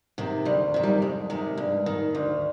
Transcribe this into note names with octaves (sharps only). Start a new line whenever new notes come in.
C3 D#3
D2 G3
C3 D#3
G3
F2 G#3
C3 D#3 G#3
G2
D#3
D2